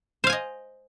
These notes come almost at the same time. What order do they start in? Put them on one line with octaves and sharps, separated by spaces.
C5 F5 G#5 D#5